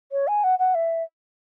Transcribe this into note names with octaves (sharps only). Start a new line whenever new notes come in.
C#5
G#5
F#5
F#5
E5